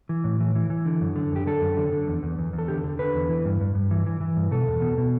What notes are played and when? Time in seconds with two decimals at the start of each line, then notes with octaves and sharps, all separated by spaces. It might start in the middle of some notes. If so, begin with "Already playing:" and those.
0.09 E3
0.24 A2
0.40 E3
0.55 E3
0.70 E3
0.86 D3
1.01 F#2
1.16 D3
1.32 F#2 G4
1.47 D3 A4
1.62 F#2
1.77 D3
1.93 D3
2.07 E2
2.23 E2
2.39 E2
2.53 E2
2.58 A4
2.68 D3 G4
2.84 D3
2.99 D3 B4
3.15 E2
3.29 E3
3.45 G2
3.61 G2
3.75 G2
3.91 E3
4.06 E3
4.21 E3
4.37 G2
4.51 B2 A4
4.68 E2
4.82 B2
4.98 B2